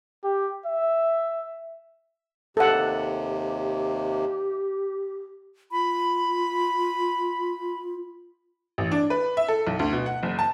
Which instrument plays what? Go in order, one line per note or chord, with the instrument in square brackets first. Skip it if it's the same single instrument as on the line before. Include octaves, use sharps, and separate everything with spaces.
[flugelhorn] G4
E5
[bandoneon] D#2 C3 [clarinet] G4 [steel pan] A4 F#5
[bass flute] F4 [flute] B5
[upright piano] A1
D4
B4
E5
A4
B1
D2
B2
F#5
F#1
A5